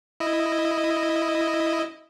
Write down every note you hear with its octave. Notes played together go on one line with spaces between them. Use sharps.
E4 D#5